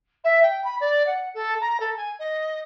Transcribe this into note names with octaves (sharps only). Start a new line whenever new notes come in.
E5
G5
B5
D5
F#5
A4
A#5
A4
G#5
D#5